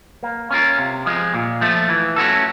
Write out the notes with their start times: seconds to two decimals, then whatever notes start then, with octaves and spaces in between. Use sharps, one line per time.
0.23 A#3
0.51 C#4 F4 A#4
0.78 C3
1.06 F3 G#3
1.34 A#2
1.61 F3 A3
1.89 E3
2.16 A3 C#4 F#4 A4